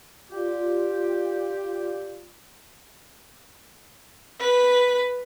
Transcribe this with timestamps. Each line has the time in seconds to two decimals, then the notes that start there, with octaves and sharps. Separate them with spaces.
0.32 F4 G4 D5
4.39 B4